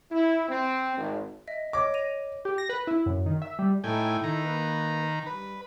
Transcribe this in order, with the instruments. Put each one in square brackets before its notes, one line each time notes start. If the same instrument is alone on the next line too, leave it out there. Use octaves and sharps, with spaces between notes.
[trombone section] E4
C4
G#1
[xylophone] D#5 E5
[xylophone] C#5 D#5 [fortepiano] D6
[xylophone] A#6 D#7 F7
[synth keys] G4
A#6
B4
E4
F#2
D#3
E5
G3
[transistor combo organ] A2 G5 G#5 [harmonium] D#4 E4 A4
[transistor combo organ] D#3 A#5
[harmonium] A#3 B4
[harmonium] G2 [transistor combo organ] B4